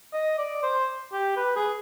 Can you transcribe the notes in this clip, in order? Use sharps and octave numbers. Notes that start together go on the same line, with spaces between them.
D#5
D5
C5
G4
B4
G#4